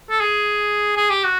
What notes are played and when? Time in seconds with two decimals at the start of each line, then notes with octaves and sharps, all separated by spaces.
0.10 A4
0.20 G#4
0.97 G#4
1.10 G4
1.24 F#4